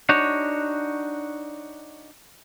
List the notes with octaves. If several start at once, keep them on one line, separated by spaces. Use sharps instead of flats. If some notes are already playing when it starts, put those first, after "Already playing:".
D4 D#4 F#4 C#5